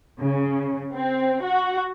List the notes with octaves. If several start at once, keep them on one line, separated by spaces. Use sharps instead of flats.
C#3
C4
F#4